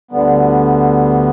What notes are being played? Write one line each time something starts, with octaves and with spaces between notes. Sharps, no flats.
D2 D3 G3 B3